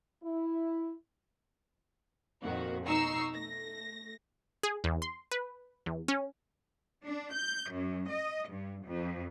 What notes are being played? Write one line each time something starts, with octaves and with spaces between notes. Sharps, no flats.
E4
F2 A#2 D#3 F#4
B2 D#4 A#5 C#6 E6 C7
A3 A#6
G#4
E2
C6
B4
E2
C#4
D4
G6
F#2
D#5
G2
F2